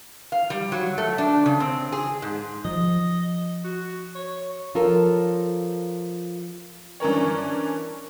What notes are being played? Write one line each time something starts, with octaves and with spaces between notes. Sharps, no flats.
F5
G3
F#3
A3
D4
C#3
C4
G#4
G#2
F3 D#5
F#4
C#5
F3 F4 A4 A#4 C#5
E3 C#4 D4 A#4 C#5